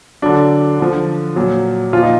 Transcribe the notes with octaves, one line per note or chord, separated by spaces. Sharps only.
D3 F#3 D4
D3 F3
A#2 F#3
A#2 F3 F4
D#4